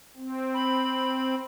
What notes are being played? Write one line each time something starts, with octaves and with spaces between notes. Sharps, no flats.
C4
B5